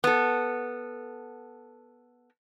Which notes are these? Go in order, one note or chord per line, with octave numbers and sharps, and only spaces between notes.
B3 A4